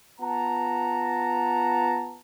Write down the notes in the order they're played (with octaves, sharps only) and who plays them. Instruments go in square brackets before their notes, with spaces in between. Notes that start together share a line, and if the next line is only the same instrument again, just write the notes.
[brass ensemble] B3 F4 F#5 A5 A#5